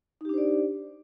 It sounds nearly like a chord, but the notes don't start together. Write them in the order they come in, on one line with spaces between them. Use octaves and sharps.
D#4 G4 D4 C5 D5